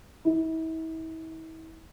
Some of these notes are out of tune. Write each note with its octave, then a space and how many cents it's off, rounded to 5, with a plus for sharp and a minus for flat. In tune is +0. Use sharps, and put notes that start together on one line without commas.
E4 -40